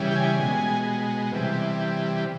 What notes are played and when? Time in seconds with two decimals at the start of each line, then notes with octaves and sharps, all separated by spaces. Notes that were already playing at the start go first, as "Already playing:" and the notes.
Already playing: C#3 E3 G3
0.11 G5
0.16 G#5
0.39 B2 G#3
1.32 C3 E3 G3